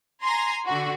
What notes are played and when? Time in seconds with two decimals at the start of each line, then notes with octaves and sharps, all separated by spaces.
0.24 G#5 A#5 C6
0.66 D3 F#4